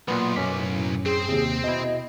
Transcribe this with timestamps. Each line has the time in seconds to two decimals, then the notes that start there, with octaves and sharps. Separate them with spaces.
0.08 B1 A#2 B3 C6
0.36 F#2 C#4 D6 B6
0.60 A2
1.06 C4 G#4 C5
1.28 D#2 C3
1.64 B2 E4 D#5